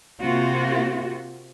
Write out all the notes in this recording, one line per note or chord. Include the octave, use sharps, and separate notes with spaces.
C3 A#3 C4 F4 F#4